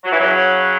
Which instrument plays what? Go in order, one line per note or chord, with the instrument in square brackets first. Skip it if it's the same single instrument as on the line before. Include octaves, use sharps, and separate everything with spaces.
[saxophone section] F#3
E3
C#3 F#3